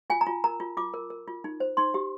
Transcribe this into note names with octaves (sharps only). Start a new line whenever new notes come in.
F4 G#5
A#5
F4
A#4 A#5
F4
F4 D6
A#4
A#4
F4
D#4
C5
D#4 C6
G4